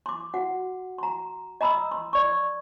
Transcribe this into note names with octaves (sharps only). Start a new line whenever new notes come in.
C6 D6
F#4 F#5
A#5 C6
D#5 A#5 B5 D#6 E6
C6
D5 C#6